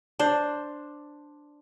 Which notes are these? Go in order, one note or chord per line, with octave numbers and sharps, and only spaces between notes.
D4 C5